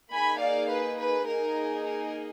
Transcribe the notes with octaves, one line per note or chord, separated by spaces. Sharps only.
A#3 D#4 G#4 G#5 B5
D5 F5
B4
B4
A#3 D#4 G#4 A#4
A#4